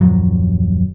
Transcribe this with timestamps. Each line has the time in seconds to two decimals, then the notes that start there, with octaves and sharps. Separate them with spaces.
0.01 D#1 F#2 F3 F#3